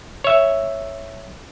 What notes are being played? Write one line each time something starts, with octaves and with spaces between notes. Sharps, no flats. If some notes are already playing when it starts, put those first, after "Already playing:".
C#5 E5